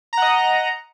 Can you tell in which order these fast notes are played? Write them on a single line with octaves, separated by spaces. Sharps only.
A#5 F#5 D#5